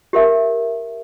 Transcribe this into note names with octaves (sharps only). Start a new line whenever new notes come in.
G4 A#4 E5